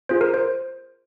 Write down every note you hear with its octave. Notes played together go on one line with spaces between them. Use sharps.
C4 F4 G#4 C5
A#4
C5